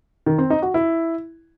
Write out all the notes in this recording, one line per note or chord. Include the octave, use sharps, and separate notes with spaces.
D#3
C4
D#4
F#4
E4